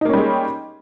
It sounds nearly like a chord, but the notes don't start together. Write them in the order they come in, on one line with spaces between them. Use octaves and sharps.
D#4 A#3 C#4 G3 G#3